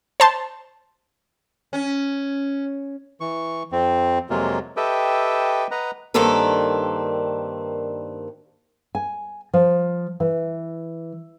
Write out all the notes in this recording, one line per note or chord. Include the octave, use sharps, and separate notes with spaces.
C5 A5 C6
C#4
E3 C#6
F2 C4
F2 C3 F#3 G#3 A#3 F4
G4 A4 B4 D#5 E5 G5
B4 D#5 F#5 A#5
G2 D#3 A#3 C4 A4 B4
G#5
F3
E3